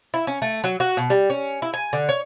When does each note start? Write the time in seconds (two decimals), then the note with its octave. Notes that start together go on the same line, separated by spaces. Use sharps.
0.14 E4
0.27 C#4
0.42 A3
0.64 F#3
0.80 F#4
0.97 B2
1.10 G3
1.30 C#4
1.62 E4
1.74 G#5
1.93 D3
2.09 C#5